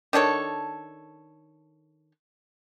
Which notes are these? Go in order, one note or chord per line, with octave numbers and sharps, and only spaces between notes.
D#3 D4 A4 C#5